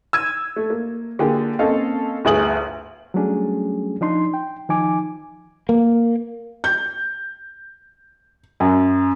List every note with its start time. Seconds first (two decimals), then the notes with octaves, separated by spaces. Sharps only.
0.13 E6 G#6 D#7
0.56 A3
0.70 A#3
1.19 D3 A#3 F4 G4 G#4
1.59 A#3 C4 C#4 A4 D#5 F5
2.25 G1 D2 G#4 D#6 F#7
3.14 F#3 G3 A3 C#4 D4 G#4
4.01 F3 D4 D#4 C6
4.34 G5
4.69 D#3 F3 D#4 G#5 D6
5.69 A#3
6.64 G6
8.60 F#2